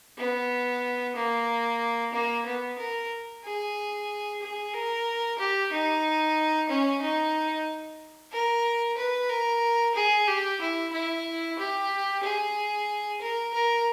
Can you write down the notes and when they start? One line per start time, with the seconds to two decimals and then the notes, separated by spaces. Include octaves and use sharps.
0.19 B3
1.16 A#3
2.13 A#3
2.46 B3
2.79 A#4
3.44 G#4
4.42 G#4
4.74 A#4
5.39 G4
5.72 D#4
6.69 C#4
7.02 D#4
8.33 A#4
8.97 B4
9.30 A#4
9.95 G#4
10.27 G4
10.61 E4
10.93 E4
11.58 G4
12.23 G#4
13.21 A#4
13.54 A#4